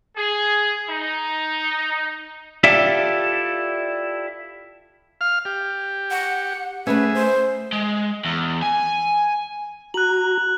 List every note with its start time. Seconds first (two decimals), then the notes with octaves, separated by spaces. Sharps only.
0.17 G#4
0.90 D#4
2.64 E4 F4 G4 A4 D5 E5
5.21 F5 F6
5.45 G4
6.11 F#5
6.87 A3 C#4 G#4 B4 E5
7.15 C5
7.73 G#3
8.25 E2
8.62 G#5
9.94 F#4 A#5 F#6 F#7